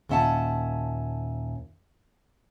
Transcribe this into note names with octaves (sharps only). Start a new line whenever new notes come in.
D#2 A#2 C#4 E5 F#5 A5